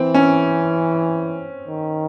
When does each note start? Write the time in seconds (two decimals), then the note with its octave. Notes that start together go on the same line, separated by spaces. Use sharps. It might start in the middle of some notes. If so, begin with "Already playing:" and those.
Already playing: E3 C4
0.15 C#4
1.68 D#3